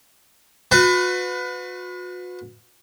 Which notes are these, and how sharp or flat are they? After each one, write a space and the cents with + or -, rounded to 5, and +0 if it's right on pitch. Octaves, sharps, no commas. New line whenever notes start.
F#4 -40 B4 +20